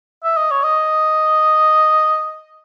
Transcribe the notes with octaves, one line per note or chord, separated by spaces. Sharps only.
E5
D#5
C#5
D#5